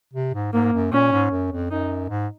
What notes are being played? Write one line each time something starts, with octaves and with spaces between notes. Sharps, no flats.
C3
G#2
G#2 A#3
F#2
A#2 C#4
G#2
F#2
F2
F#2 D#4
G#2